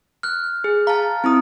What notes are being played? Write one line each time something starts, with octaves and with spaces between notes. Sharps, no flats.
F6 F#6
G#4
F5 A5 A#5
C4 E4 D#6